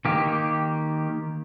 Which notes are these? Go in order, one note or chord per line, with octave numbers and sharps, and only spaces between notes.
D#3 A#3 G4